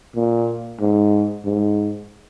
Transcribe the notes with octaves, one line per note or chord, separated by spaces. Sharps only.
A#2
G#2
G#2